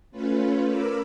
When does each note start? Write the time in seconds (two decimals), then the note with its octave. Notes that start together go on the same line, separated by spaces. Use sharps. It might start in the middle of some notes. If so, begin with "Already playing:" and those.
0.11 A3 C#4 F4 B4
0.65 A#4 B5 D6 E6